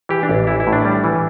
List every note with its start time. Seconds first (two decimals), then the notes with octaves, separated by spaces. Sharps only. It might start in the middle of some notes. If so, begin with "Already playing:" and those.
0.09 E3 G4
0.23 D4
0.29 A1
0.47 E3 E4
0.60 E4
0.67 A2
0.73 D4
0.85 G3
1.04 E3